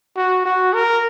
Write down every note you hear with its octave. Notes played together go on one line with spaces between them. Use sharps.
F#4
F#4
A#4